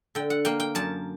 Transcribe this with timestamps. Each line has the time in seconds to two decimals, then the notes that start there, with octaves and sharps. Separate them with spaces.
0.15 D3 G5
0.30 F#5
0.45 A#3 G5
0.60 G5
0.75 F#2 A5